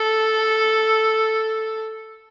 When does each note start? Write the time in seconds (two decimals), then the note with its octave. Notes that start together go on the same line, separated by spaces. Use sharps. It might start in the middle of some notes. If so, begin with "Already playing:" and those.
Already playing: A4